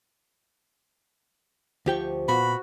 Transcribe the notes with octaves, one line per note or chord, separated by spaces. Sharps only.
D2 F3 G4 G5 C#6
A#2 B3 F#4 B5